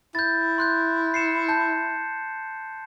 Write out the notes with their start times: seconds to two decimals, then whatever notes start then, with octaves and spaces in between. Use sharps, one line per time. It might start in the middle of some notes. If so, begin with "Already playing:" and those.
0.15 E4 G6 A6
0.58 C6 F#6 G6
1.14 C7 C#7 E7
1.49 A5 G6